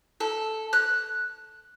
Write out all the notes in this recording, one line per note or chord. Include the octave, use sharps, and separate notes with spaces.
A4
F#6